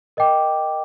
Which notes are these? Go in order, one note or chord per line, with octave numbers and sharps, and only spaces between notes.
A#4 D#5 G5 D6